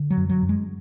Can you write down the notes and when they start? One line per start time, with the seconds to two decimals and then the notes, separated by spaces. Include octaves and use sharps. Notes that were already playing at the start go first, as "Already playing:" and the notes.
Already playing: D3
0.11 F#3
0.17 F#2
0.29 F#3
0.43 F#2
0.49 G#3